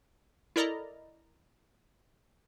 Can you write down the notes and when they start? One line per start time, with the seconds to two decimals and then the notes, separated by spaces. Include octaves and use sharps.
0.56 E4 A4 A#4 D5 D#5 A#5